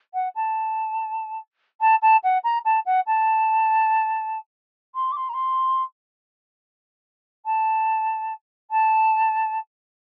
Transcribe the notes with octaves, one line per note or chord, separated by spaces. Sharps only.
F#5
A5
A5
A5
F#5
A#5
A5
F#5
A5
C6
D6
C6
A#5
C6
A5
A5